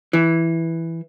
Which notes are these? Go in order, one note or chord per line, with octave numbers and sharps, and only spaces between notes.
E3